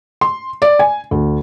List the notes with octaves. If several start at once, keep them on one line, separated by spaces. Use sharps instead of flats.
C6
D5
G#5
D2